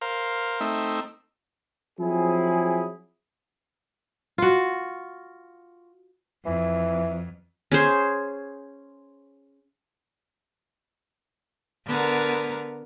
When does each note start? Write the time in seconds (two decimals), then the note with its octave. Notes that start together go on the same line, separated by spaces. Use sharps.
0.01 A#4 C5 F5
0.61 A3 C4 D#4 E5
1.99 F3 F#3 C4 E4 G#4
4.38 F4 F#4
6.46 F2 E3
7.72 C#4 G#4 C5
11.86 D3 B3 A#4